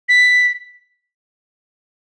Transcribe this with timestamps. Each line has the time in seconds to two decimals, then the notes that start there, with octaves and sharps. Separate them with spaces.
0.09 B6